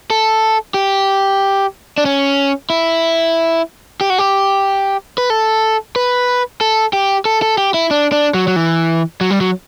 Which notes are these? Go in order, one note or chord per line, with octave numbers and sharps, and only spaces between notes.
A4
G4
D4
C#4
E4
G4
F#4
G4
B4
A4
B4
A4
G4
A4
A4
G4
E4
D4
D4
F#3
F#3
E3
F#3
G3
F#3